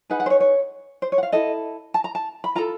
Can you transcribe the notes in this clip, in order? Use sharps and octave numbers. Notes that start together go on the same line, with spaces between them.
D#4 G#4 B4 F#5
F#5
C5
C#5
C#5
C5
C#5
F#5
F5
E4 A4 D#5
A5
A#5
A5
B5
F4 A4 A#5